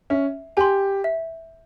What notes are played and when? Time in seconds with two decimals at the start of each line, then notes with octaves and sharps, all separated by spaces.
0.10 C#4 E5
0.57 G4 G#5 C6
1.04 E5